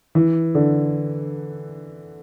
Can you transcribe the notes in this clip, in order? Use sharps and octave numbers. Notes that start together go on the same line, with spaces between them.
E3
D3